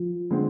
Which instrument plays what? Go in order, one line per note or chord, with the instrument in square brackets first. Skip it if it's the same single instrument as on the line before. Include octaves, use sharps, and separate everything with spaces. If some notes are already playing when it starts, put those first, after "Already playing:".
Already playing: [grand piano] F3
[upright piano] D3 G#3 C4